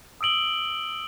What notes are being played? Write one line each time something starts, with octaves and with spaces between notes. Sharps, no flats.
D#6 E6 D7 F#7 G7